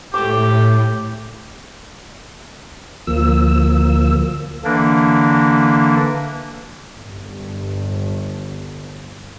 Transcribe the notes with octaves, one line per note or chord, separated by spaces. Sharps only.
A2 A3 G4 C5 D6
D2 F3 A#3 E6
D3 E3 A#3 D4
G1 G2